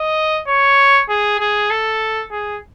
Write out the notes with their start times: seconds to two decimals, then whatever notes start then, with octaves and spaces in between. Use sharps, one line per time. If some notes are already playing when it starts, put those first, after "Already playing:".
Already playing: D#5
0.48 C#5
1.09 G#4
1.40 G#4
1.70 A4
2.32 G#4